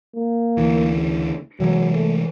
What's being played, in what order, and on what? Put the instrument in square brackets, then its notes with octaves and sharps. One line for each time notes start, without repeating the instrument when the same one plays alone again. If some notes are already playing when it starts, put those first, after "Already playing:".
[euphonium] A#3
[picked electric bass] D2 E3
[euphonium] C#3
[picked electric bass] C3 E3 G#3 [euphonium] F#3
[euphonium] A3